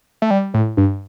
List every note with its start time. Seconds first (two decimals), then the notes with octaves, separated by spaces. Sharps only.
0.22 A3
0.31 G3
0.54 A2
0.77 G2